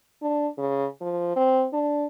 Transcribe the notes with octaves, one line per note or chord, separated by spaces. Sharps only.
D4
C#3
F3
C4
D4